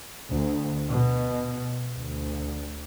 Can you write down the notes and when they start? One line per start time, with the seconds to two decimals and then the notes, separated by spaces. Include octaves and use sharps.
0.31 D2
0.89 B2
1.96 D2